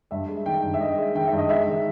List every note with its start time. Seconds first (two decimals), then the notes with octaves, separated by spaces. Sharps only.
0.11 G2 E5
0.29 G#3
0.46 D#3 G5
0.63 G2
0.74 E5
0.81 G2 D#5
0.98 G#3
1.15 D#3 G5
1.27 E5
1.33 G2
1.38 D#5
1.49 G#3 E5
1.67 D#3